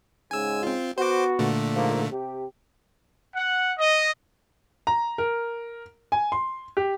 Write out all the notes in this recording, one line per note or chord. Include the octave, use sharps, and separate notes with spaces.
G#2 C#3 G#3 G#5 E6
C4 F4
B3 F#4 C5 D6
A#2 D3 A3
G#2 F3 A#3
C3 G4
F#5
D#5
A#5
A#4
G#5
C6
G4